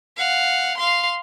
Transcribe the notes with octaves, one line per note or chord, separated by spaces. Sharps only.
F5 F#5
F5 C6